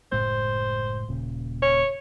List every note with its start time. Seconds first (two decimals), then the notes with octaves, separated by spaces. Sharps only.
0.12 F#1 A2 G#3 C5
1.08 D#1 A#2 C#3
1.62 C#5